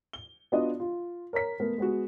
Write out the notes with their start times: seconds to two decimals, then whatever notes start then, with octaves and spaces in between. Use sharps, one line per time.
0.13 G7
0.52 B3 D4 F4 F#4 D5 D#5
0.80 F4
1.33 A#4 C#5 A#5 B6
1.60 A3 B3 A#4
1.78 G#3 B3 F#4